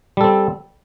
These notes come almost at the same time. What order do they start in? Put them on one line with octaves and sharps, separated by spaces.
G3 A4 C4